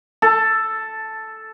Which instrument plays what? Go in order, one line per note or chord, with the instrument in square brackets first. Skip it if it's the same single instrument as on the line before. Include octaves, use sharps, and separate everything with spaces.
[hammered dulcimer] A4